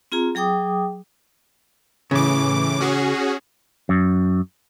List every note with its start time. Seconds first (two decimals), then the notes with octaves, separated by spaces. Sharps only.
0.12 C4 F4 G#4 A#5
0.35 F#3 G#4 G5 D6 D#6
2.11 A2 C#3 E3 D6
2.80 C#4 F#4 G#4
3.89 F#2